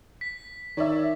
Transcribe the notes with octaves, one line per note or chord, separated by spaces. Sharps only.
B6
D#3 C#5 D5 E5